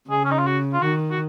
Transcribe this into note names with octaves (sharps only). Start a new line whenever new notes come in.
C#3 G#4
C#4
D#4
F4
F#4
F4
D#3 F#4
F#4